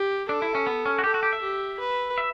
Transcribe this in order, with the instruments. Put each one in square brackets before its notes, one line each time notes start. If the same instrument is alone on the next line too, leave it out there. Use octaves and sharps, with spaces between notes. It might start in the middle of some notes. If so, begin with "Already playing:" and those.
Already playing: [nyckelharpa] G4
[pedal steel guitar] D4 [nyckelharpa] A4
[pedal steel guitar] E4
C#4
B3
C#4
F#4
[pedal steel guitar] G4 [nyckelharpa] A4
[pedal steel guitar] F#4
G4
E5
[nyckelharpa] G4
B4
[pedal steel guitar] E5